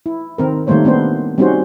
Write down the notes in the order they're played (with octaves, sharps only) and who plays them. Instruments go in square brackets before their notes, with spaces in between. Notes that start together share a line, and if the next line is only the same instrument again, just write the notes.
[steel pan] E4
D#3 C4 A#4
D#3 G3 A3 A#3 C5 C#5
A3 B3 C4 D4 C5
G3 C4 C#4 D#4 F#4 C5